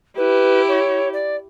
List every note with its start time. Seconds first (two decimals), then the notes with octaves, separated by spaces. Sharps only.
0.17 E4 G4 B4
0.68 C#5
1.13 D5